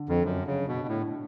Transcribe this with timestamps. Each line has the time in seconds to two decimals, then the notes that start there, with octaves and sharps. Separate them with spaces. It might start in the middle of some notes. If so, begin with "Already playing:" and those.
Already playing: D3
0.09 F2
0.24 F#2
0.47 C#3
0.68 B2
0.88 A2